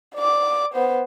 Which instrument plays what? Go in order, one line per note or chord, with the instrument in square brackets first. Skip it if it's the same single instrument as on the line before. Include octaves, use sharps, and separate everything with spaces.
[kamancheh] D5 D6
B3 C5